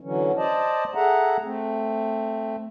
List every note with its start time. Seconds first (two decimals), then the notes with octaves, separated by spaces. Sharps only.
0.01 D3 E3 F#3 C#4
0.37 C5 D5 D#5 A5
0.95 G#4 A4 E5 F#5 A#5
1.43 A3 C4